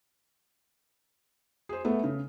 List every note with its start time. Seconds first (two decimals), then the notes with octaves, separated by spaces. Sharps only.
1.69 G#4 C5
1.85 A3 B3
2.04 C#3